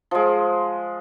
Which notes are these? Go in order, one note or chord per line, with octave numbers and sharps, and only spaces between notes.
F3 G#3